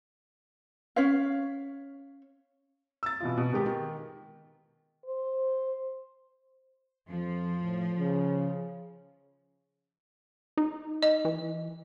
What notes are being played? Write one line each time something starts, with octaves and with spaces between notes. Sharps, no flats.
C#4 C#5 F5
E6 A6
B2 E3 F4
B2
B2 D#3 G#3 G4
D#3
C5
F2 F3
A2
C#3
D#4
D#5
E3